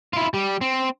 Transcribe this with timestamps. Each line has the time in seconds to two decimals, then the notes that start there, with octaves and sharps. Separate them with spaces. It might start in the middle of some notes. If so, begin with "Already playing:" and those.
0.13 E4 F4
0.34 G3
0.61 C4